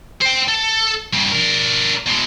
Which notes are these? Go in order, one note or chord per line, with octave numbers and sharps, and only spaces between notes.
C5 G5
A4
G2 C#3
D4 A#4
B2 G#3